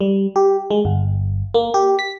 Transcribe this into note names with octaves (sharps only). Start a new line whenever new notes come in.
G3
G4
G#3
G1
A#3
G4
B6